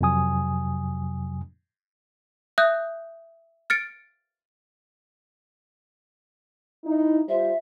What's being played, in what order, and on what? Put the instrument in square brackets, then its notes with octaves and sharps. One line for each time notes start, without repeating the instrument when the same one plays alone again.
[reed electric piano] F2 C3 F#3 G#5 D#6
[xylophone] E5 D#6 F#6 G6
F6 A6 C#7 D7
[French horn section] D#4 E4
[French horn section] G3 F4 C5 [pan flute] E5